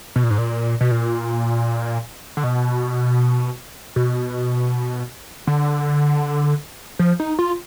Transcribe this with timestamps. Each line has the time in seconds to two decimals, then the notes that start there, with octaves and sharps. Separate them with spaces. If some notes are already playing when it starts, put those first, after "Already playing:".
0.16 B2
0.24 A#2
0.30 G#2
0.38 A#2
0.81 B2
0.91 A#2
2.37 D3
2.44 B2
3.96 B2
5.47 D3
6.99 F3
7.20 D#4
7.39 F4